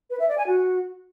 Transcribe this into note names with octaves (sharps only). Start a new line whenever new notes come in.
B4
E5
D5
G#5
F#4